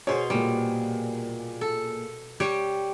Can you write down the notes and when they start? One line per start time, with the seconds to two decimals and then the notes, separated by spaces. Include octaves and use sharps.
0.07 B2 G#4 C5 C#5
0.30 A#2 G3 G#4
1.61 A4
2.40 G3 G4 C#5